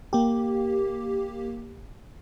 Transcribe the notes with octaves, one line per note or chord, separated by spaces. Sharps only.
A#3 G4